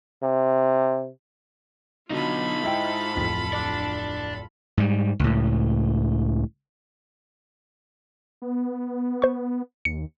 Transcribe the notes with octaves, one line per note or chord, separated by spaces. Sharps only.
C3
B2 D3 F#3 D#4 F4 A4 B5
G#2 E4 D#5 G5
D1 F2 B6
D5 A5
G#2 G3
C#2 A2
B3
C5 C#6
D#2 C#7